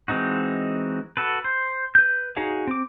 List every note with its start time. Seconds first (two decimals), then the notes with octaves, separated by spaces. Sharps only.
0.08 E3 G#3 C4 D#4 F#4
1.17 F#4 A4 B4
1.44 C5
1.95 B4 G6
2.37 D#4 F#4 G#4 C#5 F5
2.67 C4 D6